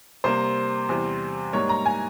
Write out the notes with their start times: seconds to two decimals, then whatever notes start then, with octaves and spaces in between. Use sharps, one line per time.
0.24 C3 G3 A#3 C5
0.89 E2 C3 G3
1.53 G#2 G3 A#3 C#5
1.69 A#5
1.86 G#5